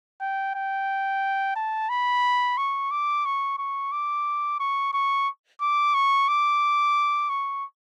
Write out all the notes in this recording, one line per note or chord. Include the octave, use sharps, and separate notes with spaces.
G5
G5
A5
B5
C#6
D6
C#6
C#6
D6
C#6
C#6
D6
C#6
D6
C#6